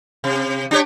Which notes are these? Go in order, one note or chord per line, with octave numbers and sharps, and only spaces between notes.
C3
D4 G4 C#5